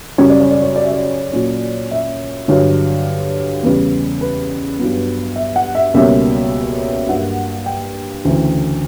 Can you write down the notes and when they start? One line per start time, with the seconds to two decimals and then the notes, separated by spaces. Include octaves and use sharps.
0.18 F#2 C#3 G3 C#4 C#5
0.30 D5
0.40 C#5
0.51 D5
0.62 C#5
0.76 D5
0.83 E5
0.92 D5
1.33 A#2 F#3 C#4
1.91 E5
2.48 G2 D3 F#3 C#5
3.63 E2 C#3 G3 B4
4.21 B4
4.79 G2 F#3 B3
5.36 E5
5.56 F#5
5.75 E5
5.94 C#2 B2 G3 A#3 C#4 E5
7.09 G2 F#3 A#3 F#5
7.66 G5
8.25 D2 C#3 E3